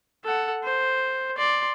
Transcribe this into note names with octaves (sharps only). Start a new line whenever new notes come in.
A4 F#5
C5
D5 C6